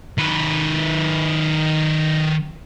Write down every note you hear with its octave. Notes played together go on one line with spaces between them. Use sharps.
D#3 B4